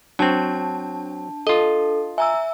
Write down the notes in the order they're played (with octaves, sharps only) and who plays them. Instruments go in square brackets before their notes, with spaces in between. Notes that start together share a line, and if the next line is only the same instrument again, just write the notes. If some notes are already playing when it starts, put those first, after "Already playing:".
[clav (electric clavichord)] F#3 C4 [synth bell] D4 A5
[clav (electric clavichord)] F4 D#5 [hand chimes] A4
[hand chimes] E5 [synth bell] G#5 A#5 E6